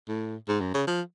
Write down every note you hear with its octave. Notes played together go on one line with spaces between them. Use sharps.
A2
G#2
F#2
C#3
F3